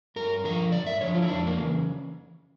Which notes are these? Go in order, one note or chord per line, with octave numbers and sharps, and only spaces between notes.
G2 A#4
D3 F3 A#4
G2 D5
E5
D3 F3 C#5
F4
E4
F2 D4
A#3
C#3 E3